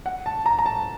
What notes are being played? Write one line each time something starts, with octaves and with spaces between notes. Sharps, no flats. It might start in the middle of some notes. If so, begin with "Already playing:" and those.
F#5
A5
A#5
A#5
A5